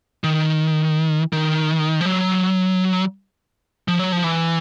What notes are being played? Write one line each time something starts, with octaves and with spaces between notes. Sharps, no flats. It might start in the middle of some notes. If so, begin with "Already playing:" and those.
D#3
D#3
F3
F#3
F3
F#3
F3
E3